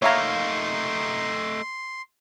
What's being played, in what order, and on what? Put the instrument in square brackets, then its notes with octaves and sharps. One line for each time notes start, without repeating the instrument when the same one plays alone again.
[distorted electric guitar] A3 D#4 [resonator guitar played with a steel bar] A#3 F5 [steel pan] C#5 E5 A#5 [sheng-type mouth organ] C6